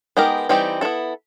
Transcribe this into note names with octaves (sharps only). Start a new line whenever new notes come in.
G#3 B3 D#4 G4 A#4
E3 G3 C4 D#4 G4
B3 E4 A4